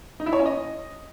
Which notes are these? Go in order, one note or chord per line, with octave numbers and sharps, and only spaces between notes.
D#4
E4
C#5
C#4
D#5